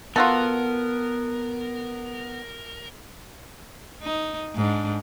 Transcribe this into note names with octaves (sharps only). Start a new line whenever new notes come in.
B3 F4 F#4 A4 A#4
D#4
G#2 D4